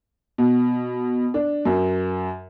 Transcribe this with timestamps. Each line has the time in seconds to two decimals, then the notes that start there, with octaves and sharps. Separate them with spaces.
0.38 B2
1.34 D4
1.65 F#2